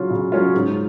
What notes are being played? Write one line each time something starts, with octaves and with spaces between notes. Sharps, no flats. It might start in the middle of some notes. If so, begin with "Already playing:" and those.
Already playing: C#3 F#3 C#4 F4
C#3
F#3 C#4 F4
G#2